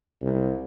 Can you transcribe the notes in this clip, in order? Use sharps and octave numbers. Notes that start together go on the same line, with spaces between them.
C2